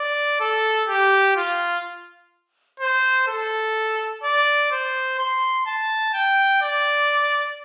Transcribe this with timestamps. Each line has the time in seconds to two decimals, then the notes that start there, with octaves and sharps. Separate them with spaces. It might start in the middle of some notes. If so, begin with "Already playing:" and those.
Already playing: D5
0.40 A4
0.88 G4
1.36 F4
2.80 C5
3.28 A4
4.23 D5
4.71 C5
5.18 C6
5.66 A5
6.14 G5
6.62 D5